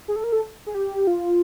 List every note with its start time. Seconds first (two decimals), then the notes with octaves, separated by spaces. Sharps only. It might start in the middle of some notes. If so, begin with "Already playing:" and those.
0.08 G#4
0.16 A4
0.24 A#4
0.32 A4
0.67 G#4
0.74 G4
1.07 F4